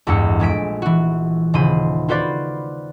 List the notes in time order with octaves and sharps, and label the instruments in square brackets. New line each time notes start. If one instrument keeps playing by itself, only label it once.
[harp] A1 E2 G2 G#3 E6 C#7
A#1 G#3 B6 D7
E3 F#4
D#1 C#3 C5 B5 D#7
F4 F#4 B4 C5 D5 B5